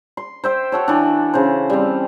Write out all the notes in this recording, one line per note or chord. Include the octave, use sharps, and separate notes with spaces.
C6
C5 E5 G5
F#4 A4 C#5
E3 D4
C#3 C5
G3 C4